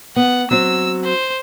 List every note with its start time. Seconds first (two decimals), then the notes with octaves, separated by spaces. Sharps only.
0.16 B3 F#5
0.51 F#3 C4 E6
1.04 C5